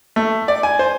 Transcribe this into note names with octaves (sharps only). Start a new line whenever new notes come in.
A3
D5
G#5
C5